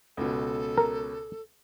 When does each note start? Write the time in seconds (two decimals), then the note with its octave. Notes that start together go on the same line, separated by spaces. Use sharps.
0.17 C#2 B2 A4
0.78 A#4